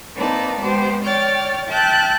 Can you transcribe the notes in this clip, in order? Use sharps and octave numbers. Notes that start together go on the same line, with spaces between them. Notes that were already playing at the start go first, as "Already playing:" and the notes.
A#3 C4 D#4 B4 D5 A5
G#3 B3 G4 C5
C#5 D5 G5 F6 A6
E5 G5 A5 F#6 G6